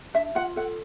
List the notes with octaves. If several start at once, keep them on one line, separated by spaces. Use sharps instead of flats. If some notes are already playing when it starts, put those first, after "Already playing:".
D4 E5
F4 F#5
A4 F#5